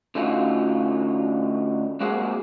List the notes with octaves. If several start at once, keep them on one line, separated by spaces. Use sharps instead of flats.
D3 A3 C#4 D#4 F4 F#4
G#3 A#3 C4 F#4 G#4 F#5